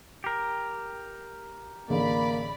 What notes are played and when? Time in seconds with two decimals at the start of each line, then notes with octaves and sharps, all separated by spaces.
0.24 G4 A#4
1.89 A1 D3 A#3 G#4 D5 B5